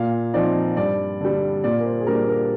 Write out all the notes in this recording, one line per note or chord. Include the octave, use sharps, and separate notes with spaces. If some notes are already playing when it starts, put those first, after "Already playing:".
Already playing: A#2 F5
F3 C4 D#4 D5
G2 D5
D3 G3
A#2 D5
A#4
C5
G#4
G3 A#3 D4 A#4
A#4